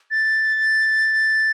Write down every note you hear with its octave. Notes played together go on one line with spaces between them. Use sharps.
A6